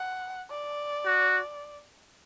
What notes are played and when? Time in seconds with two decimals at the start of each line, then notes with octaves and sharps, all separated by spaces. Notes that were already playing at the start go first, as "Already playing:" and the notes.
Already playing: F#5
0.50 D5
1.06 F#4